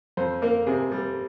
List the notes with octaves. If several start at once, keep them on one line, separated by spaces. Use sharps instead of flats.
F2 C5
A#3 A#4
C3 G#4
G3